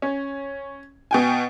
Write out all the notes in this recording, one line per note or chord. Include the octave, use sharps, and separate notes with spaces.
C#4
B2 G5 G#5